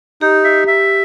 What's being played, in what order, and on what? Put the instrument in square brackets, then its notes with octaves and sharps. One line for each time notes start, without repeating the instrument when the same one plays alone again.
[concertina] D#4 [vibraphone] G4
[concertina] E5
E5